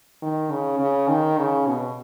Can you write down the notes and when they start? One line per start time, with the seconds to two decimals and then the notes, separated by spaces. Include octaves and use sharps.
0.22 D#3
0.51 C#3
0.79 C#3
1.09 D#3
1.38 C#3
1.67 B2